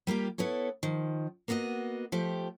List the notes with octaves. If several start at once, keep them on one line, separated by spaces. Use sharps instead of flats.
G3 A#3 F4 G4
B3 E4 A4 C#5
D#3 F3
A#3 B3 F#4 D5 D#5
F3 A3 G4